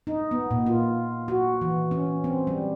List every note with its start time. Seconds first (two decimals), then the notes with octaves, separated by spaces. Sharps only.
0.07 D#4
0.31 B3
0.51 A#2
0.66 F4
1.28 F#4
1.61 E3
1.91 C#4
2.24 C4
2.47 G3